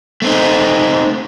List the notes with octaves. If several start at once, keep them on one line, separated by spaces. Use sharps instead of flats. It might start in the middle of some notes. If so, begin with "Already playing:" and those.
A3 C4 D#4